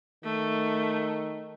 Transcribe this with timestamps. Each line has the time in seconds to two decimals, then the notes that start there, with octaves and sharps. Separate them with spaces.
0.24 D#3 A3